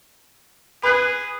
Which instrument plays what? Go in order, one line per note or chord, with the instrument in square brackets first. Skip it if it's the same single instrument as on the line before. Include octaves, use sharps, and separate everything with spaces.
[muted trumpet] G#4 [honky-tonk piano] B4 F#6